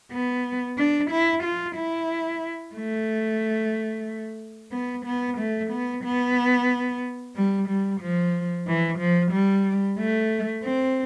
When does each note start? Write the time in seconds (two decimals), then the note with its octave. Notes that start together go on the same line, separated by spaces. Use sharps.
0.12 B3
0.78 D4
1.11 E4
1.44 F4
1.76 E4
2.76 A3
4.72 B3
5.06 B3
5.38 A3
5.71 B3
6.04 B3
7.36 G3
7.69 G3
8.01 F3
8.67 E3
8.99 F3
9.32 G3
9.98 A3
10.63 C4